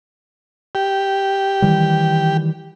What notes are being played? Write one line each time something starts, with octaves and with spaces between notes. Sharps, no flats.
G4
D#3 E3 G3